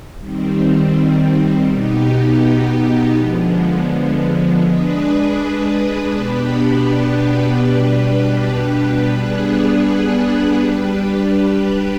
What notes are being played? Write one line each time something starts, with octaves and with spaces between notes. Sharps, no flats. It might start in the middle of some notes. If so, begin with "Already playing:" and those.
D#3 G3 C4
B2 B3 D#4 G4
D3 F3 G#3 B3
G#3 D4 G#4 B4
B2 B3 D4 G4 B4
B2 G3 D4 G4 B4
G3 B3 D4 G#4 B4
G3 D4 G4 B4